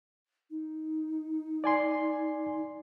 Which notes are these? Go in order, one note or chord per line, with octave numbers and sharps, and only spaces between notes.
D#4
D5 G#5 C6